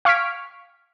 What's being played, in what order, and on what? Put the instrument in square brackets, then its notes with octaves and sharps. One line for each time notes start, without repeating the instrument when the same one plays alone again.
[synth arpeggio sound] F5 C#6 F6 G#6 B6 D7